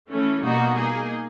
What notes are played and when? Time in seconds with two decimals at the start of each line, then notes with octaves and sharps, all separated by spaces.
0.09 E3 A3 C#4
0.42 B2 G3 A#3 D#4 F#4
0.76 A#3 D#4 G#4